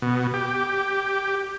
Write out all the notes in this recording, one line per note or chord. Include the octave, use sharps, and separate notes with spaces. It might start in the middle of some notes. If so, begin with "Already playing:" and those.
B2
G4